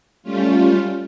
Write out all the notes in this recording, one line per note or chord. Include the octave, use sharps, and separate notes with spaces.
G3 A3 C#4 F4